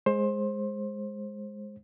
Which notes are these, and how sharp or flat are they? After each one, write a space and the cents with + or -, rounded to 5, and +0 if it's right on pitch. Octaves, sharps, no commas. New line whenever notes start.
G#3 +0 C5 +20